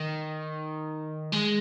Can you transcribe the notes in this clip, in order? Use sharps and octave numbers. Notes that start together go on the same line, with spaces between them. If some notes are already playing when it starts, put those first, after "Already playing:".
Already playing: D#3
G#3